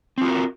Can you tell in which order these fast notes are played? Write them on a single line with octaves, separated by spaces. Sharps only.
C4 F4 F#4 A#4